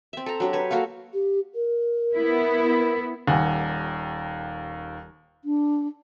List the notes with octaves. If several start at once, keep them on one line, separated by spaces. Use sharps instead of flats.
C4 E5
A4 A#5
F#3 D4 G4
B4 C#5
A#3 F#4 A4 F5
G4
A#4
B3 E4
D#1 D#2 F#5 G#5
D4